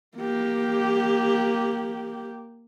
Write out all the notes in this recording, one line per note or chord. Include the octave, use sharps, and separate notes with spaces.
A#3 G4